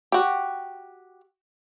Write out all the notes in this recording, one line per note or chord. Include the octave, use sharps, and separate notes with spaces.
F#4 G4